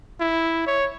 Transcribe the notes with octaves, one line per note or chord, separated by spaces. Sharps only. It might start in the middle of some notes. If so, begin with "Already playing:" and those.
E4
C#5